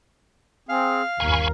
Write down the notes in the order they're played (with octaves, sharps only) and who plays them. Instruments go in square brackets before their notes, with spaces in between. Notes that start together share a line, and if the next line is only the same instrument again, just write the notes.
[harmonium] C4 G#4 [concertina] F5
[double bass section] G1 D#2 [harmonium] A#4 [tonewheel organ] G#5 B5 C#6